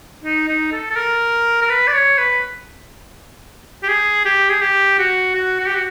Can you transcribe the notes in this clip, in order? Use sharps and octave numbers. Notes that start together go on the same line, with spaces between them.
D#4
D#4
A4
A4
A#4
A#4
B4
D5
C#5
B4
G4
G#4
G4
G#4
G4
F#4
F#4
F#4
G4
F#4